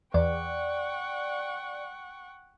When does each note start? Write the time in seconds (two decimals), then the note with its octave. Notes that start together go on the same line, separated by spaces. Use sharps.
0.14 E2 D5 F#5 G5 C#6